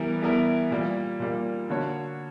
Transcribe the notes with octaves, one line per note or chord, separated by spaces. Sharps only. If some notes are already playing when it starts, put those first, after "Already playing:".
Already playing: E3 G3 B3 E4 A#4
E3 G3 B3 E4 A#4
A#2 G3 A#3
A#2 G3 A#3
D3 A#3 D4 F#4 C#5